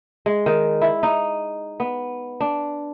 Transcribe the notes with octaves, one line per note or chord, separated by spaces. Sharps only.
G#3
D#3
E4
D#4
B3
D4